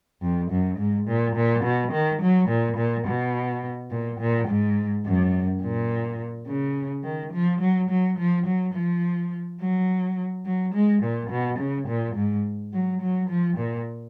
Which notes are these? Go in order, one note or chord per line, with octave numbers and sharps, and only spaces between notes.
F2
F#2
G#2
A#2
A#2
B2
D#3
F#3
A#2
A#2
B2
A#2
A#2
G#2
F#2
A#2
C#3
D#3
F3
F#3
F#3
F3
F#3
F3
F#3
F#3
G#3
A#2
B2
C#3
A#2
G#2
F#3
F#3
F3
A#2